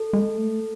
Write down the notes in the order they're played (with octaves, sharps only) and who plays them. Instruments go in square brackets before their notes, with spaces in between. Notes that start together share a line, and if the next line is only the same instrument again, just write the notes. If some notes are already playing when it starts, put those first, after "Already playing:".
Already playing: [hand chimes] A4
[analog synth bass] G#3
A3